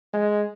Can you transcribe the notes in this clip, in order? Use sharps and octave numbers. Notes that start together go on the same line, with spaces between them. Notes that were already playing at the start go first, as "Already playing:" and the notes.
G#3